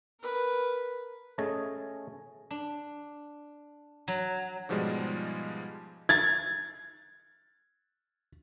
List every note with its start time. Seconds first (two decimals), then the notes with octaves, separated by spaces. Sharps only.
0.20 A#4 B4
1.38 A3 C#4 G#4 C#5 D#5 A5
2.51 D4
4.08 F#3
4.69 G#2 B2 F3 G3 G#3 F4
6.09 G#6 A6